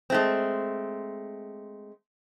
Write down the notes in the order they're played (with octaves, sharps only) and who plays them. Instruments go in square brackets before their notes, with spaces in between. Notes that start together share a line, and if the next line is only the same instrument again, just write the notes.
[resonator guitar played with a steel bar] G#3 A3 C4